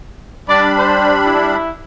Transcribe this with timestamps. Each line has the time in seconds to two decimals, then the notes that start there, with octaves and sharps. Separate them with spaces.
0.49 G3 D4 D5 B5
0.78 C5
1.26 E4